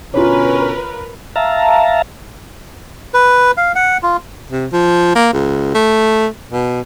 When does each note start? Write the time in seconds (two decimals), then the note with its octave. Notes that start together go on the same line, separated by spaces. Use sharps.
0.14 B2 D3 C#4 F4 A#4 B4 C#5
1.36 E5 F5 A5 A#5
3.14 B4
3.57 F5
3.75 F#5
4.03 F4
4.51 C3
4.73 F3
5.15 A#3
5.33 C#2
5.75 A3
6.52 B2